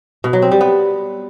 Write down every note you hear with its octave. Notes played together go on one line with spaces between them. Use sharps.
B2
F#3
C4
G3
B3